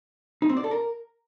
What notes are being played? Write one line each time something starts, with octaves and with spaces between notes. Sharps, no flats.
D#4
C4
D5
A4
A#4